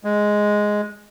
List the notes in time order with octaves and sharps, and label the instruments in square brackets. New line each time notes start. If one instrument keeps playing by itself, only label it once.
[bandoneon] G#3